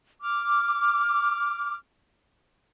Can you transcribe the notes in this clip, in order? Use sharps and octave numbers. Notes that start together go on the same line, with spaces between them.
D6 F6